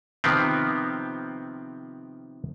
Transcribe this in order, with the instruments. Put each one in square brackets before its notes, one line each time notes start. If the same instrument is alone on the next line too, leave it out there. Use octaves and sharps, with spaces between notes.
[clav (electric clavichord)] C3 D#3 F3 B3 C4